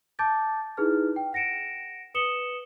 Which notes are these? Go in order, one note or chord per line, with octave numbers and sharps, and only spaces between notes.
A5 D6 G6 A6
D#4 E4 G#4 B4 F6
G5
F#5 A#6 C#7 D7 E7
B4 D#6 C#7 E7 F#7 G7